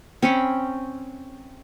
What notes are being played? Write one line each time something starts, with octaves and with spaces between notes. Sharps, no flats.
C4 C#4 B5 C#6